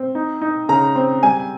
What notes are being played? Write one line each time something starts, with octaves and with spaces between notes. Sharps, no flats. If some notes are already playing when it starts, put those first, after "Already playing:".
Already playing: C4
D#4
D#4
C#3 A#5
C4
G3 G#5